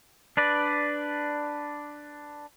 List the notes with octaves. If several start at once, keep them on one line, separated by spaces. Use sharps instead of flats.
D4 B4 D5